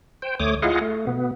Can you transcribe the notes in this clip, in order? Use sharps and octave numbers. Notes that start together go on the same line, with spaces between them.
C5 G5
D2 A3 C#5 D6 D#6
E4 F4 G#4 D#5 F5 F#5
A3
B2 B3